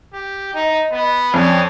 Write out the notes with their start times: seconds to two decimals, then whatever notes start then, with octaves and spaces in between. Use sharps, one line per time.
0.13 G4
0.54 D#4 D#5
0.92 B3
1.34 F2 C#4 D5